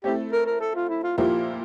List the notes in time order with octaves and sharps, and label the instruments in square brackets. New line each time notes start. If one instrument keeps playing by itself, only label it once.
[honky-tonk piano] A3 C4 E4 A4 [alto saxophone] G4
[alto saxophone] A#4
A#4
A4
F4
E4
F4
[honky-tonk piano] A#2 F3 A#3 E4 G4 [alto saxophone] F4